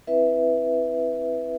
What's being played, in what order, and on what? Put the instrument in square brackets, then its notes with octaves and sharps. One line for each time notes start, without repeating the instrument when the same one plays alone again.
[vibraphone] C4 E4 B4 E5